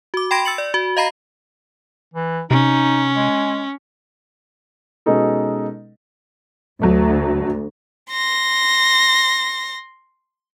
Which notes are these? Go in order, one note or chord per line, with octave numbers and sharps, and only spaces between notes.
F#4 D6
G5 B5 C6 G#6 A#6 D7
E6 A6 C#7 F#7
D5
F#4
D#5 F5 A#5 B5 A#6 C7
E3
C3 C#4 D#4
G#3
B2 G#3 C#4 D#4 A4
D2 F#3 A3
C6 A#6